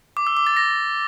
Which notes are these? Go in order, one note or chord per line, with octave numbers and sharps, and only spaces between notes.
D6
E6
D6
A6
A#6